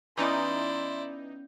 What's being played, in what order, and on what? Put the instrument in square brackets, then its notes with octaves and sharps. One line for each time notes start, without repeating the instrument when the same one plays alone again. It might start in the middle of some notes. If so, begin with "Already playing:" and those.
[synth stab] E3 D#4 [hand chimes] B3 C#4 G6 [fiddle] E4 D5 [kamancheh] C6